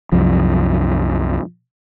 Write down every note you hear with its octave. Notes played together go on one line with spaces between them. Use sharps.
C2 F#2 F3